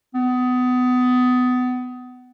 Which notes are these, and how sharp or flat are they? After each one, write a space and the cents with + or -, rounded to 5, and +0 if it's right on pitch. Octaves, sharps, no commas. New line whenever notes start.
B3 +25